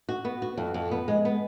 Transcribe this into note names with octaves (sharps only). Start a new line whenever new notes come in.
F#4
B3
F#4
F2
F2
B3
G#3
B3